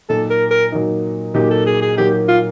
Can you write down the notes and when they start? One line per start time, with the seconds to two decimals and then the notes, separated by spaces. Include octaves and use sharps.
0.09 A#2 F#3 A#3 D#4 A4
0.30 A#4
0.51 A#4
0.72 A#2 F#3 A#3 D#4
1.34 A#2 F#3 A#3 D#4 G4
1.50 A4
1.66 G#4
1.82 G#4
1.97 A#2 F#3 A#3 D#4 G4
2.28 F4